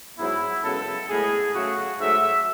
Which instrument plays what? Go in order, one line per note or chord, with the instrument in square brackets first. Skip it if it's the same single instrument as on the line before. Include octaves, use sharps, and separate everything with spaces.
[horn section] G#2 F#3 B3 E4
F#2 C#3 G#3 B3 A4
A2 G#3 B3 G#4
C#3 F#3 A3 F#4
G#2 F#3 A3 E5